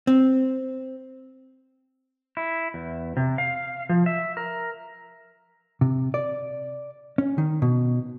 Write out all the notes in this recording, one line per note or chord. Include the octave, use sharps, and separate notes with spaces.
C4
E4
E2
C3
F5
F3
E5
A#4
C3
D5
C#4
D#3
B2